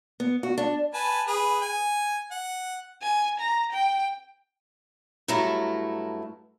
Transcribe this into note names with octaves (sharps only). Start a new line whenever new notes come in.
B3
F#4
D4
B4 G#5 A5
G#4 B4
G#5
F#5
G#5
A#5
G5
G2 F#3 A3 E4 A#4 A#5